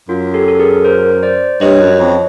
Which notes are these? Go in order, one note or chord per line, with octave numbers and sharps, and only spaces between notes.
F#2 F4
G4 A4
A4
G#4 A#4
A#4 C5
C5 D5
G2 C#5 D#5
F#2
F2